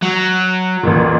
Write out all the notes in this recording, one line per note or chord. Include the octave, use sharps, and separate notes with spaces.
F#3
A1 F2 A#2